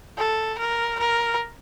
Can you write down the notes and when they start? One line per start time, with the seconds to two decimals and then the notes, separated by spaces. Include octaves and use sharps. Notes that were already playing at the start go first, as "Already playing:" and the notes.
0.18 A4
0.59 A#4
0.99 A#4